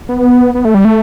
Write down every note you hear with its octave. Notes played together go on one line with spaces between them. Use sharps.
B3
B3
A3
G3
A3